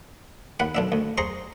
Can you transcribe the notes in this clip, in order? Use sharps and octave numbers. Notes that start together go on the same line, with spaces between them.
D#2 F#5 B5
B1 D4 E5
D2
G#4 C5 A#5 C6 C#6